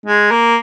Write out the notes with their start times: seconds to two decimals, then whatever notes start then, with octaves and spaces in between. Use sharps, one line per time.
0.06 G#3
0.31 A#3